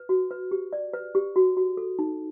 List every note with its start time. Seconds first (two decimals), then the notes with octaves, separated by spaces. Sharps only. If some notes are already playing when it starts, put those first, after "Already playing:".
Already playing: B4
0.09 F#4
0.31 B4
0.51 G4
0.73 D5
0.93 B4
1.15 G4
1.36 F#4
1.57 F#4
1.77 A4
1.99 D#4